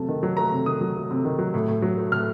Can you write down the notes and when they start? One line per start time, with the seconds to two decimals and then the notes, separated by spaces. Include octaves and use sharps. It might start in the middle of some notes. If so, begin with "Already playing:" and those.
Already playing: C3 F#3 A3 A5
0.09 D#3
0.23 F#3
0.37 A3 A#5
0.52 C3
0.66 D#3 D#6
0.81 F#3
0.96 A3
1.11 C3
1.25 D#3
1.39 F#3
1.54 A2
1.68 A2
1.82 F#3
1.97 A3
2.12 A2 F6